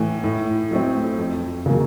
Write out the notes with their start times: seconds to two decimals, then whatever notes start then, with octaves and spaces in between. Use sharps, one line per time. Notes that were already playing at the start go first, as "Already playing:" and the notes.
Already playing: A2 E3
0.24 A2
0.71 F#3 A3 C4
1.18 F2
1.66 C#3 F#3 A#3